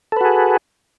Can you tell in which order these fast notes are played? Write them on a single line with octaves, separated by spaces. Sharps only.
A4 B4 F#4 G#4